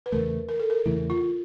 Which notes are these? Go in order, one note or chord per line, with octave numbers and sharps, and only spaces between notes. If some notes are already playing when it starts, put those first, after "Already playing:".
B4
E2 C#3 E3 A3 A#4
A#4
A4
A#4
E2 C#3 E3 A3 E4
F4